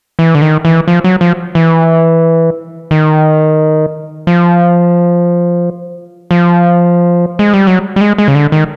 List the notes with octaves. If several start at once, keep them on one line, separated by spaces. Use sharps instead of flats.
E3
D3
D#3
E3
F3
F#3
F3
E3
D#3
F3
F3
G#3
G3
F#3
G3
G#3
G#3
C#3
D3
D#3